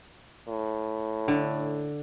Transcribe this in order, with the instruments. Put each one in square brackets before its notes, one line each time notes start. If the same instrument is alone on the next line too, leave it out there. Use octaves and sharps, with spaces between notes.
[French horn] A2
[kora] D3